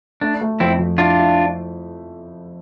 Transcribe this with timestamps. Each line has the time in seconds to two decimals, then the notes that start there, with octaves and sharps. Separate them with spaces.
0.21 A3 D4
0.41 A3
0.60 F2 C4 E4
0.79 F2
0.98 D4 E4 F4
1.18 E4